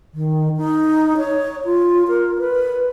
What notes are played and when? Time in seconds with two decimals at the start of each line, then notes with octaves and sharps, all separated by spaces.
0.14 D#3
0.57 D#4
1.18 C#5
1.65 F4
2.08 A#4
2.39 B4